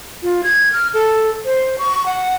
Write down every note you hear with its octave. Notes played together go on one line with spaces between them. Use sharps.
F4
G#6
F6
A4
C5
C#6
F#5